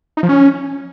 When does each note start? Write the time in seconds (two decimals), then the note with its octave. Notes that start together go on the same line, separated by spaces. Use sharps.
0.17 D#4
0.23 F3
0.29 C#4